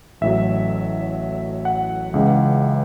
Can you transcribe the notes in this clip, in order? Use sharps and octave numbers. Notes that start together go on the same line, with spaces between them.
A1 A2 F#3 E5
F#5
C#2 C#3 E3